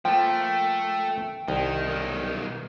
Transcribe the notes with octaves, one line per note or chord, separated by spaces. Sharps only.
F3 A3 A#3 G5
C2 D#3
B1 D#3